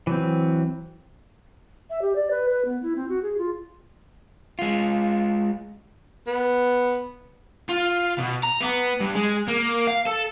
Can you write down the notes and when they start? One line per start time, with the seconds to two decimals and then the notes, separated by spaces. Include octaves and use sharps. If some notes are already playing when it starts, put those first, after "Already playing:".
0.07 E3 F#3 C4
1.90 E5
2.02 G4
2.16 D5
2.31 B4
2.50 B4
2.65 B3
2.82 E4
2.96 C4
3.09 F#4
3.23 G#4
3.38 F4
4.59 G#3 F4
6.27 B3
7.69 F4
8.18 B2
8.43 A#5
8.61 B3
9.01 G2
9.15 G#3
9.48 A#3
9.87 F5
10.06 A4